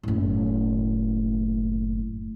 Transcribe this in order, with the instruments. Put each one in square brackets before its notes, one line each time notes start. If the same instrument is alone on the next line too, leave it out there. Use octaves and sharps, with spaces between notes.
[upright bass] F#1 A2